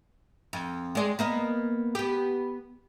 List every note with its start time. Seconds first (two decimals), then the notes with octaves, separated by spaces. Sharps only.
0.53 F2
0.95 G#3 D5
1.19 A#3 B3 D#5
1.95 B3 G4